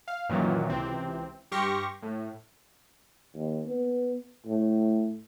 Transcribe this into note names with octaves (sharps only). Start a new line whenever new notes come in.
F5
F#2 A#2 D#3 E3 F#3
C#2 C3 E3 C4
G2 G4 C6 C#6 F6 A#6
A2
D#2
B3
A2